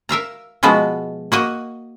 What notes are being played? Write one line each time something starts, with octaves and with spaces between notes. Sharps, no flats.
A#4 E5 F5 A#5
B2 F3 G#3 B3 F#4
A#3 F#4 D#5